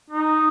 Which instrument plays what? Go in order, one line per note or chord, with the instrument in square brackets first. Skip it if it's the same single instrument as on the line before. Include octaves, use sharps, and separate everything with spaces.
[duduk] D#4